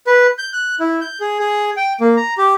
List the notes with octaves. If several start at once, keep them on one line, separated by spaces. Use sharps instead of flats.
B4
G6
F#6
E4
G6
G#4
G#4
G5
A#3
A#5
G4